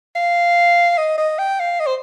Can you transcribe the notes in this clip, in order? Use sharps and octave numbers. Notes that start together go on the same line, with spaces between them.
F5
D#5
D#5
G5
F5
D#5
C5